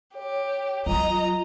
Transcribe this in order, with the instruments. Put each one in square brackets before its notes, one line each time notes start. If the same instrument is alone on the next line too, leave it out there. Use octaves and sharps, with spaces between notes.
[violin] G4 [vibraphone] C#5
[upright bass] F#3 [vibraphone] F4 [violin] D#5 A#5